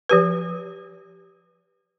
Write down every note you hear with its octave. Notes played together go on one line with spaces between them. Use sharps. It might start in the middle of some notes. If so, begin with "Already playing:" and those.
F3 G4 B4